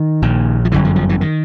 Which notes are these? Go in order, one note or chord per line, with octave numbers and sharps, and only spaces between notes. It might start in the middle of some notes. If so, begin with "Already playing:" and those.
Already playing: D#3
A#1 A#2
F3
G1 F#2 D3 E3
F3
F3
E3
D#3